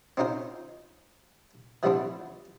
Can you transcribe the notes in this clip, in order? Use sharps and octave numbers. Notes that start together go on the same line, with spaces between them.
C4 C#4 D#4 F4 C5
E3 F3 G3 B3 C4 D4